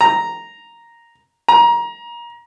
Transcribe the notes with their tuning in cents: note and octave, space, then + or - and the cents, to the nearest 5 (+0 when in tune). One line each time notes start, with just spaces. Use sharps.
A#5 +0
A#5 +25